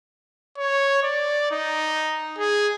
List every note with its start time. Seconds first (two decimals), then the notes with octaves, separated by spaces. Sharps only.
0.58 C#5
1.03 D5
1.51 D#4
2.38 G#4